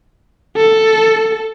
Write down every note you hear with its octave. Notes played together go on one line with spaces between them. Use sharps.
A4